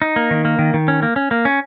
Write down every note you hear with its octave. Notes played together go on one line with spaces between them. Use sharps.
D#4
A#3
D#3
A#3
D#3
D#3
C#4
A#3
C#4
A#3
C#4